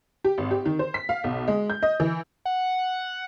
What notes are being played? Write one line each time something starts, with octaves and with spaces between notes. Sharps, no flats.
G4
G#1
G4
D#3
C5
B6
F5
B1
G#3
G6
D#5
E3
F#5